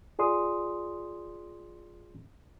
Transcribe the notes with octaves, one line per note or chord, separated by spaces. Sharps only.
F4 G#4 D5 C6 D#6